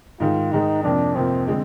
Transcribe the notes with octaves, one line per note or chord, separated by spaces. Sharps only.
G#2 D#3 G#3 F4
G#2 D#3 G#3 D#4
F2 C3 F3 A#3 D4
F2 C3 F3 A#3 C4
D3 G#3 C4